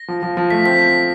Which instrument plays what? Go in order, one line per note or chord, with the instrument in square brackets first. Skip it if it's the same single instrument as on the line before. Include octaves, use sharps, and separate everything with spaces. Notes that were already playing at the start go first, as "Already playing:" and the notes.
Already playing: [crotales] A#6
[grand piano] F3
F3
F3
[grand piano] A3 [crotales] B6
[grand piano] C4 [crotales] B6